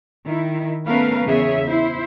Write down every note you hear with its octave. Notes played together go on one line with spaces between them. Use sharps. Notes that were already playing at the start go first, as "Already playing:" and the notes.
D#3 E4
A3 B3 C#4 A#4 B4 F5
E2 C#3 G#4 C#5 E5
E4 C5